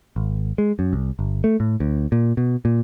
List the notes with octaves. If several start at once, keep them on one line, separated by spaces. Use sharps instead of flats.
G#1
G#3
F#2
C2
G1
A3
A2
D2
A#2
B2
A#2